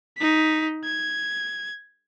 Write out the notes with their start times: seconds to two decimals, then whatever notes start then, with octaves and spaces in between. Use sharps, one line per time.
0.18 D#4 B6
0.84 G#6